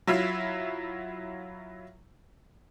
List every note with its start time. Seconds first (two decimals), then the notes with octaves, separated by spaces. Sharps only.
0.07 F#3 E4 F4